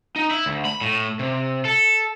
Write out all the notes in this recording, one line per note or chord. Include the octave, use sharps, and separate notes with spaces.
D#4
E4
D2
B5
A2
C3
A4